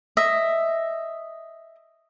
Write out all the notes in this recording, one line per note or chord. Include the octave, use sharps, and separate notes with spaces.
D#5 E5